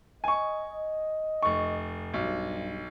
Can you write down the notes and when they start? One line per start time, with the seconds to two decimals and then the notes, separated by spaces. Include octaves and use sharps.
0.24 D#5 G#5 C#6
1.43 F1 C#6
2.14 B1 G2